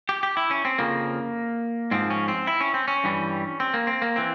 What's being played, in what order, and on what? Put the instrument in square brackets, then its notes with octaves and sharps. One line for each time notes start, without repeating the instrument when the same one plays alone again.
[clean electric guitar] G4
G4
E4
C#4
C4
F2 C#3 F3 A#3
G#2 F3 C4
C#4
C4
E4
C#4
C4
C#4
G2 E3 G3
C4
A#3
C4
A#3
E3 C4